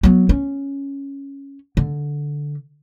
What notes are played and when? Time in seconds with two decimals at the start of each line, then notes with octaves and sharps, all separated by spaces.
0.03 F#3 B3
0.29 C#4
1.77 D3